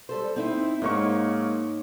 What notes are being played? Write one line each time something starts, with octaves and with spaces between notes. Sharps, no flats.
G3 A4 C5
C4 D#4 E4
G#2 A#3 D#4 C#5 C#6